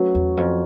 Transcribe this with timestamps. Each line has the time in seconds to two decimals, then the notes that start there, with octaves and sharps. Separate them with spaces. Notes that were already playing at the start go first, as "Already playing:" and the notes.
Already playing: F#3 A3 C#4 F#4 B4
0.15 E2
0.37 F2